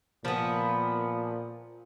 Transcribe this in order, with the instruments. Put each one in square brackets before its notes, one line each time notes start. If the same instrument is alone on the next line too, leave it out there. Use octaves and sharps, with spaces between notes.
[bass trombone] A#2 [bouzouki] F3 B3